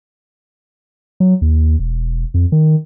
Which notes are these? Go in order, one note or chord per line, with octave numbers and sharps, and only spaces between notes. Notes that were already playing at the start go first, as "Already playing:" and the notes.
F#3
D#2
E1
F2
D#3